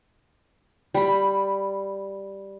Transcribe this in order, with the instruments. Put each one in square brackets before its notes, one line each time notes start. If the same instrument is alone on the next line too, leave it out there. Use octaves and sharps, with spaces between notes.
[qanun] G3 B5